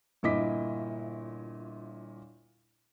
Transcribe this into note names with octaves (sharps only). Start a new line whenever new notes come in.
G1 A#2 E4 D#5 D6 B6